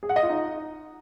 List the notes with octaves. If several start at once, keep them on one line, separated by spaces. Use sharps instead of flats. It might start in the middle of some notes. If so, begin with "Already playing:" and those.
G#4
F#5
D#5
F4
D#4